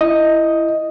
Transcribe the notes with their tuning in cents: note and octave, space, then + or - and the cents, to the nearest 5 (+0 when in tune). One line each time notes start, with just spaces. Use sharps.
E4 +15 D#5 +0